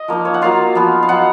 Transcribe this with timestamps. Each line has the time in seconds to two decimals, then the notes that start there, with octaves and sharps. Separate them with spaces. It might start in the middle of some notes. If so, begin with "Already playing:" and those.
Already playing: D#5
0.08 F3 A#3 D#4
0.25 C#5
0.34 F#5
0.42 F#3 A#3 F4 F5
0.75 F3 B3 D#4
1.03 F5
1.09 F#3 B3 D#4 F#5